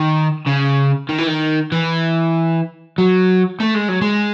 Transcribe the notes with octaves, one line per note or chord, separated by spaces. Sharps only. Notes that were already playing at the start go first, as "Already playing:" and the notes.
Already playing: D#3
C#3
D#3
E3
D#3
E3
F#3
A3
G#3
F#3
G#3